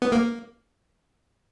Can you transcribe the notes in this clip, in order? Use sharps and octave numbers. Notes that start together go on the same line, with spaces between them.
B3
A#3